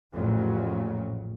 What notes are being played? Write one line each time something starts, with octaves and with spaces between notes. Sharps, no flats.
A1 F2 A#2 C#3 F#3